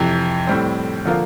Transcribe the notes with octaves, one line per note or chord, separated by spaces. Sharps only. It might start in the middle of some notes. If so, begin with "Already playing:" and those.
Already playing: F2 C3 E3
A2 G3 C4
D3 F3 A#3 F4